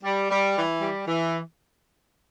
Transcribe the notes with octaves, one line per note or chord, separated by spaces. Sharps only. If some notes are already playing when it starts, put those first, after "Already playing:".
G3
G3
E3
G3
E3